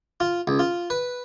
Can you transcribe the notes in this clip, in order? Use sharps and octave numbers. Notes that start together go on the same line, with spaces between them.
F4
C#2
F4
B4